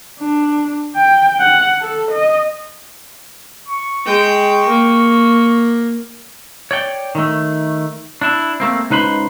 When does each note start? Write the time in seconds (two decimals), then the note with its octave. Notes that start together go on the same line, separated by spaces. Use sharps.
0.20 D4
0.95 G5
1.40 F#5
1.81 A4
2.12 D#5
3.68 C#6
4.06 G#3 G5
4.68 A#3
6.71 C#5 D5 G5
7.15 D#3 A3
8.21 D4 E4
8.60 A3 A#3 C4
8.90 C#2 D#4 B4 C5 B5